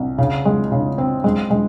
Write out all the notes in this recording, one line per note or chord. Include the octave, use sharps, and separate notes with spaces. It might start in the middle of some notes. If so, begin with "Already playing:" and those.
Already playing: C2
C#3
G#3
C#3
C4
G#3
G#3